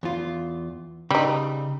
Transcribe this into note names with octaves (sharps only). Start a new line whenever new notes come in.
E2 F4
C#3 G3 D#4